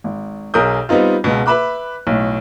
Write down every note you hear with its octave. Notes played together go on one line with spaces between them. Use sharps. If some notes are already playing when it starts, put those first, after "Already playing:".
G#1
B1 G#4 A#4 D#6 G6
G3 B3 C4 D#4 F4
C#2 B2
B4 E5 B5 D6 F#6
B1 A2